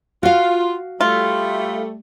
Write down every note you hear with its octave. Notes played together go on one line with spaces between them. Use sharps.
F4 F#4 F5
G3 A3 F4